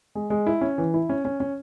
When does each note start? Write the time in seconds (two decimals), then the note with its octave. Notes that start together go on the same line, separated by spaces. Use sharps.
0.15 G#3
0.30 G#3
0.47 E4
0.61 C#4
0.78 E3
0.94 E4
1.09 C#4
1.25 C#4
1.40 C#4